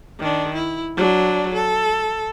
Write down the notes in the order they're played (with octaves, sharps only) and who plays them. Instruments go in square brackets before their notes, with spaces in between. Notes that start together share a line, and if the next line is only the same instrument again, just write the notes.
[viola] D#3 D4
E4
F#3 D4
A4